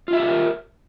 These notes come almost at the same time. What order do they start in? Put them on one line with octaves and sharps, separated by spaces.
F4 E5 G4 A4 A#4